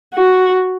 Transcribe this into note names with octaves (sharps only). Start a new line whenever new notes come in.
F#4